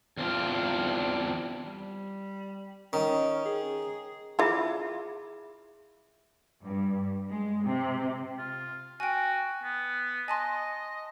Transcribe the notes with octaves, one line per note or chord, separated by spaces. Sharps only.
E2 C4 D4 F4
G3
D#3 C#4
G#4
E4 F4 G#4 E5 B5
G2
G#3
C3
F4
F#4 G5 G#5
B3
D#5 G#5 A5 C6